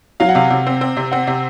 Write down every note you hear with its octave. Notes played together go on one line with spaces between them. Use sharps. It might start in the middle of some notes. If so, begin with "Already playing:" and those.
F#3 F5
F#5
C3 F5
C3
C4
C4
C3
C4 F#5
C3